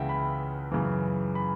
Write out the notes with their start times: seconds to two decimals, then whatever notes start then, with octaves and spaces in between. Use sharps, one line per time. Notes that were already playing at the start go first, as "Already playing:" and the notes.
Already playing: C#2 C#3 E3 E5 F#5 G5
0.09 B5
0.72 F#2 C#3 E3
1.35 B5